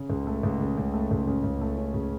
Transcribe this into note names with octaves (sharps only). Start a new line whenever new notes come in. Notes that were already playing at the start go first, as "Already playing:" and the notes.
Already playing: C#3
C#2
A3
C#2
C#3
C#2
A3
C#2
C#3
C#2
A3
C#4
C#3